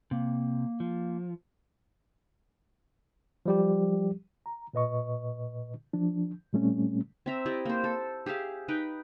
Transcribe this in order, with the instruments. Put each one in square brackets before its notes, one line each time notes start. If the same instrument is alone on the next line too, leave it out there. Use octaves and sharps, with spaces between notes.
[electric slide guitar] C3 [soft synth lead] A#3
[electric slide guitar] F3
[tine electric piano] F3 G3 G4
[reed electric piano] A#5
A#2 B4 D#5 C#6
F3 D4
A#2 G3 A3 C4 C#4
[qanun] C4 E5 A#5
E4 G4 D5 D#5
A#3 C5
A4
G4 G#4 E5 F5
D#4 B4 G5